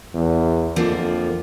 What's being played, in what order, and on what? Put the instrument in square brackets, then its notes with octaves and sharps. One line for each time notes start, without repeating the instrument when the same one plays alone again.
[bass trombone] E2
[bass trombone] F2 [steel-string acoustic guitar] D3 F3 A#3